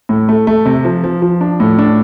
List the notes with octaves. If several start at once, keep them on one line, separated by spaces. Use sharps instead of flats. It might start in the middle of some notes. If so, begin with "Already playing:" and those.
A2
A3
A3
C3
F3
F3
F3
D4
A2
D4